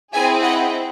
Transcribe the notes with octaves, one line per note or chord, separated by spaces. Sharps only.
C4 E4 G#4 E5 G#5
D#5 F#5